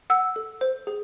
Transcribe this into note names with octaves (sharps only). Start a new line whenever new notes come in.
F#5 E6
A4
C5
G#4